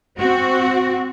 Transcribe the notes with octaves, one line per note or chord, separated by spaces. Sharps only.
C4 F#4